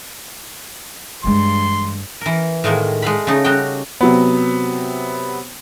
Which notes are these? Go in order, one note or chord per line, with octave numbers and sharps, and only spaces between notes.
G2 E3 G#3 C6
E3 A#4
A2 D#3 G#3 A#3
G#3 A3 F5 B5
C#3 A3 D#4
C#3 G3 D#4 F#4 G5
C3 F#3 B3